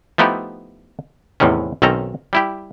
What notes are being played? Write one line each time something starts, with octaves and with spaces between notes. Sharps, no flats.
F3 A3 B3 D#4 E4 G4
E2 A2 C3 D#3 C#4
B1 D#3 C4 C#4 A4 A#5
G3 E4 G4